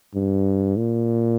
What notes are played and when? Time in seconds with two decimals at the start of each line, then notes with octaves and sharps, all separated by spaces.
0.14 G2
0.77 A#2